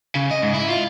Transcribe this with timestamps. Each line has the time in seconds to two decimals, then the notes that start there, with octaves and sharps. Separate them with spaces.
0.15 C#3
0.31 D#5
0.42 G#2
0.54 E4
0.69 F4